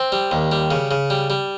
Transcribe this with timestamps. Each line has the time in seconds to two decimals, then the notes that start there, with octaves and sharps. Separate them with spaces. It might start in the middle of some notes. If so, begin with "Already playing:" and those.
Already playing: C4
0.12 G3
0.31 D#2
0.52 G3
0.71 C#3
0.91 C#3
1.10 G3
1.30 G3